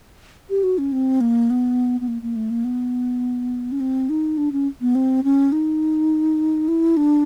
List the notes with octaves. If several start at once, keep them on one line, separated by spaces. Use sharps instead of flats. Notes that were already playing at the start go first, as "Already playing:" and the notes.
G4
F#4
C#4
C4
A#3
B3
B3
A#3
A#3
A3
A#3
B3
C#4
C4
D#4
D4
C#4
B3
C4
C#4
D#4
E4
D4